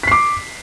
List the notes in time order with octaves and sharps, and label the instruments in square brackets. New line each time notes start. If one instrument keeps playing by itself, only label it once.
[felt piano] B6
C7
D6